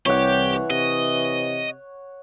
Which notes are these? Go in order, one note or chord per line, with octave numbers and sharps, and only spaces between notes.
C2 E3 G4 C#5 F#5
C3 D#5